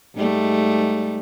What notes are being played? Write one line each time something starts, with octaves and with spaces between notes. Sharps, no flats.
G#2 G3 A3